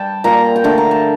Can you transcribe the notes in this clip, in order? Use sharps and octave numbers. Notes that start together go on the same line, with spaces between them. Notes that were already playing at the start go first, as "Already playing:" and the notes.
Already playing: G3 G5 A5
A#2 G3 A#5
G5
D3 A3 A5
A#5
A5